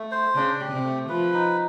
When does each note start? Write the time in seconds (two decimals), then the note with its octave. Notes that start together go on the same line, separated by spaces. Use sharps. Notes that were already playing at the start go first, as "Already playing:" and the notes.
Already playing: A3
0.11 C5
0.35 C#3 D4
0.61 G4
0.73 C3
0.84 A3
1.09 F3 B4
1.34 D#4